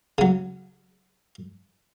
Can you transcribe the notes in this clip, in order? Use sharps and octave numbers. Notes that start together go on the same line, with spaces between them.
C#3 F#3